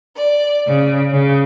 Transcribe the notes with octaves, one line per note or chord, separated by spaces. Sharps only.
D5
C#3
C#3